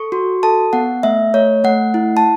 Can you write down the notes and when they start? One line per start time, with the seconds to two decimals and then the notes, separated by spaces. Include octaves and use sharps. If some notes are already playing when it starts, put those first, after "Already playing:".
Already playing: A4 C#6
0.12 F#4
0.43 A4 A5
0.73 B3 F#5
1.03 A3 E5
1.34 A3 C#5
1.64 A3 F#5
1.94 E4
2.17 A5